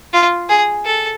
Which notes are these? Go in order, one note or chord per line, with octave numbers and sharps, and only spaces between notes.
F4
G#4
A4